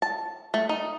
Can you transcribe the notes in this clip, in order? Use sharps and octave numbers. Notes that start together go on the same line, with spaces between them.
A5
A3
D#4